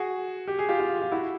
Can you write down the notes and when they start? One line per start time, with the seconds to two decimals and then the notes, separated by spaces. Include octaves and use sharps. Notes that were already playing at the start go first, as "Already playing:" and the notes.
Already playing: F#4 G#4
0.48 G4
0.59 G#4
0.69 F4 G4
0.80 F4
1.02 F4
1.12 E4 F#4